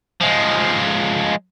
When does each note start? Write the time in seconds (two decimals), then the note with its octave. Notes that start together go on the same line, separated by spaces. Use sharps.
0.21 F3 G#3